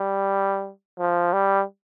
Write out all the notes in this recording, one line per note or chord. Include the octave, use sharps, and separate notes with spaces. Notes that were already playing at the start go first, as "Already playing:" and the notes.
Already playing: G3
F3
G3